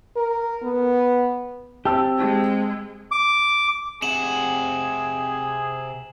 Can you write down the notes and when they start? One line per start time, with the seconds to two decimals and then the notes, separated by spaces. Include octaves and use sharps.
0.16 A#4
0.63 B3
1.85 C4 G4 A5 E6
2.18 G#3
3.11 D6
4.02 C3 G#4 F#5 E7 F#7